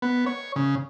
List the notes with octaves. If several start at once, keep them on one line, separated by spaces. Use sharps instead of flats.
B3
C#5
C#3